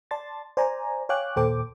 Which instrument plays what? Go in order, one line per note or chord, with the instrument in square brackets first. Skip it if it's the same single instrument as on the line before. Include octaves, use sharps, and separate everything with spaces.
[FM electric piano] D5 A5 C6 A6
C5 D5 G#5 A#5
C#5 F5 G5 G#5 D6 F#6
D#2 A#2 A4 C5 G5 D6